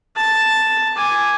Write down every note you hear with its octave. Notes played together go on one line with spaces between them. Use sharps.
A5
G#5 D6